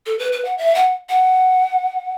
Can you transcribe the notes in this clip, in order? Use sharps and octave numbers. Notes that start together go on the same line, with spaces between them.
A4
B4
B4
F#5
E5
F#5
F#5